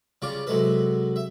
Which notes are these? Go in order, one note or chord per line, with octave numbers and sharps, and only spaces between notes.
C#3 G3 F4 C#6 D6
C3 F#3 G#3 A4 B4
E5